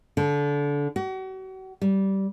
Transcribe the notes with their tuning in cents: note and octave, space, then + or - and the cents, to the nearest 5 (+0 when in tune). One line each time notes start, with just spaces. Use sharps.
D3 -25
F#4 +40
G3 -15